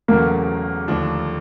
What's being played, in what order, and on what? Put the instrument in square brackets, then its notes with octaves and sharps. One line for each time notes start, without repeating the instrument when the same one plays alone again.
[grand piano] E1 E2 C#3 F#3 A3 [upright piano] A#3
[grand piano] D#2 D3 F3 A3 D4